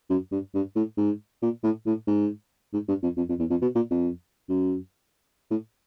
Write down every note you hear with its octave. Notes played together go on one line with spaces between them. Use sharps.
F#2
G2
G2
A2
G#2
A#2
A2
A2
G#2
G#2
G2
F2
F2
F2
E2
F2
B2
A#2
F2
F#2
A2